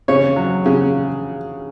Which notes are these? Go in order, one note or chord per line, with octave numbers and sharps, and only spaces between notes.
C#3 C#5
F#3
C#3